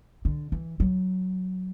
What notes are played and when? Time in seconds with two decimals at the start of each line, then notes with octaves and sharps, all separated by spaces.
0.25 D3
0.52 E3
0.80 F#3